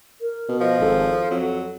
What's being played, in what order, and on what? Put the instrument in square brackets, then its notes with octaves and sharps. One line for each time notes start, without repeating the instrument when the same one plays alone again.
[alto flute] A#4
[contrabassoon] B2
[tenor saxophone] F3 [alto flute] D#5
[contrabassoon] G#1 [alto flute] A4
[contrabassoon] F2 [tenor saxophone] F#3